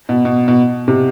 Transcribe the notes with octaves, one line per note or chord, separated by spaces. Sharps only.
B2
B2
B2
C3